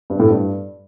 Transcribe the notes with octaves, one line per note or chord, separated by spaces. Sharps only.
G2
A2
G2